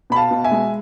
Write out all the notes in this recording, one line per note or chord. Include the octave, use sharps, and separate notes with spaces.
B2 B5
F5 A5
B2
E5 G#5
G#3